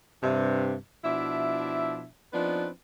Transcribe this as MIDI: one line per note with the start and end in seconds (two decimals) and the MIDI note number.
0.23 0.75 43
0.23 0.75 48
1.05 2.06 47
1.05 2.06 53
1.05 2.06 62
1.05 2.06 64
1.05 2.06 76
2.33 2.68 53
2.33 2.68 59
2.33 2.68 60
2.33 2.68 62
2.33 2.68 63
2.33 2.68 71